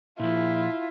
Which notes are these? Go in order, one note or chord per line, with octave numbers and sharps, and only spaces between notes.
A#2 F3 E4 F4